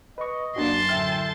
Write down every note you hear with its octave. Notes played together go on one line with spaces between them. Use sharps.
B4 D#5 C#6
F#2 A#3 D4 F#4 A5 C6
A2 D3 E5 G5 F6